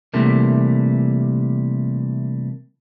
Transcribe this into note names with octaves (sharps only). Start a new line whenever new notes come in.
C3 E3 G3 A3 A#3